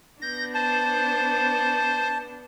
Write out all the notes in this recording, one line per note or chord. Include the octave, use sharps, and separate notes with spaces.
B3 D4 G6 A#6
C5 A5